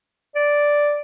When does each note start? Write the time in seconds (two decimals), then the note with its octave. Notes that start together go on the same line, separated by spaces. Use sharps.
0.35 D5